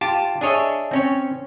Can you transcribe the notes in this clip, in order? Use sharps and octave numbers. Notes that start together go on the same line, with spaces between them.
F4 G4 A5
D4 G#4 C#5 D#5 E5
C4 C#4 C#5